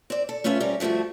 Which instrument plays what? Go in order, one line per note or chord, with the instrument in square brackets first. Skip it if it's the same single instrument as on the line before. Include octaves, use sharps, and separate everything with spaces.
[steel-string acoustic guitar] C4 D5
A4
A3 C#4 F4 B4 E5
G3 C4 C#4 A#4
G2 F3 A3 C4 F#4